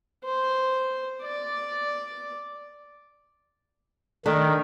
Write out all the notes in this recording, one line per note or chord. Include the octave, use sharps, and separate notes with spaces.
C5
D5
D#3 A3 D4